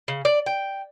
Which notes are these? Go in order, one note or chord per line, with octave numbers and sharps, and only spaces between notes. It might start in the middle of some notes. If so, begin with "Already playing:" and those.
C#3
D5
G5